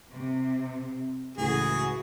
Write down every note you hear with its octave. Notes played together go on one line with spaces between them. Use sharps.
C3
C#2 A2 E3 F#4 G#4